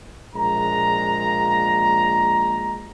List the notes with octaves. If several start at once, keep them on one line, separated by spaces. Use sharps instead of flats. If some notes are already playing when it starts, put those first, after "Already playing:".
A#1 A#2 G#3 A#5